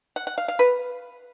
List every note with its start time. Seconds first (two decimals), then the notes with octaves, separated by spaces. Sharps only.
0.16 F#5
0.27 F#5
0.38 F5
0.48 F5
0.59 B4